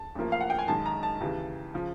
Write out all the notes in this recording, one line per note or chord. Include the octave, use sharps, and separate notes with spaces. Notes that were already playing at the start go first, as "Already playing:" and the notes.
Already playing: A5
A1 A2 F3 A#3
F5
F#5
G5
G#5
F#2 D#3 G#3 A5
A#5
A5
D#2 C#3 E3
C#3 F3